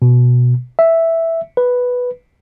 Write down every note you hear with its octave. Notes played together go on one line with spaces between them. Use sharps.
B2
E5
B4